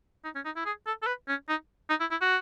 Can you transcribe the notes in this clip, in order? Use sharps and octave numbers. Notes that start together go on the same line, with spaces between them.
D#4
C#4
D#4
E4
G#4
A4
A4
B4
C#4
D#4
D#4
E4
E4
F#4